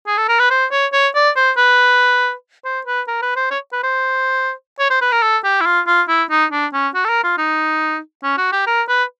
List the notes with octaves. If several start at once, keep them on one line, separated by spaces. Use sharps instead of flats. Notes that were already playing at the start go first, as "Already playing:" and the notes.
G#4
A4
A#4
B4
C5
C#5
C#5
D5
C5
B4
C5
B4
A#4
B4
C5
C#5
B4
C5
C#5
C5
B4
A#4
A4
G4
E4
F4
F4
E4
D#4
D4
C#4
F#4
A4
A#4
F4
D#4
C#4
F#4
G4
A#4
B4